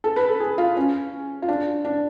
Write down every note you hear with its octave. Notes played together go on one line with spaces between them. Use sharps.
A4
B4
A4
G#4
F4
C#4
F4
D4
D4